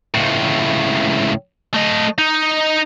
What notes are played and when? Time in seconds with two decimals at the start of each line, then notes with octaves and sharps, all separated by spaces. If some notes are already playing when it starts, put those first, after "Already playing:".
0.14 C#2 A2
1.74 A3 D#5
2.18 D#4